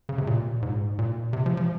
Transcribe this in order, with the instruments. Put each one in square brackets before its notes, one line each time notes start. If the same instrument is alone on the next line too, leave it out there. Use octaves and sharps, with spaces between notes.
[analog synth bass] C#3
C3
A#2
G#2
A#2
C3
F3
F3